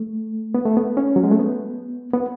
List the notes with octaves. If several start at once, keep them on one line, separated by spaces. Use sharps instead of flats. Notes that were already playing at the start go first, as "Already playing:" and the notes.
Already playing: A3
B3
A3
B3
C#4
F#3
G#3
A3
B3
B3